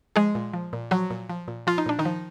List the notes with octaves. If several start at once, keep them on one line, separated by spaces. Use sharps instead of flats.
F3 G#3 G#4
A#2
F3
A#2
F3 F#3 F#4
A#2
F3
A#2
F3 F4
D#4
A#2 D4
D#3 D#4
F3